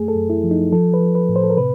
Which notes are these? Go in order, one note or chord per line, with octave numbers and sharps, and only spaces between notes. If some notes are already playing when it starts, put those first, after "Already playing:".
Already playing: F#2 A3 G#4
A4
F#2
E4
F3
D#4
F3 A4
B4
F3
B4
A2
C5
A4
A#4
C3 B4